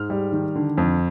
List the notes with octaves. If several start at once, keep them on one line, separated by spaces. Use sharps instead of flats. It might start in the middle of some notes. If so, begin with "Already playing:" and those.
Already playing: G#2 F6
G3
D#3
D3
F2